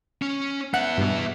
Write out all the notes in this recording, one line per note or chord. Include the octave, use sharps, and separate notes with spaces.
C#4
B3 E5 F#5
G2 B2